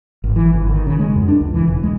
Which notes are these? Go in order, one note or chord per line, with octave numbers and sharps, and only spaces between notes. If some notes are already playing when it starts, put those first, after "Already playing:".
G#1
E3
G1
D#3
C#3
G#3
F#2
D4
C#2
E3
E1
G#3